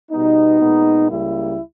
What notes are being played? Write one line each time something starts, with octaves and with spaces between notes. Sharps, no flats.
B2 G3 B3 D#4
A#2 G#3 B3
C#2 C#3 G3 A#3 E4